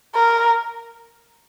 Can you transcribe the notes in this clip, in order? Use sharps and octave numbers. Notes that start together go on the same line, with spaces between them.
A#4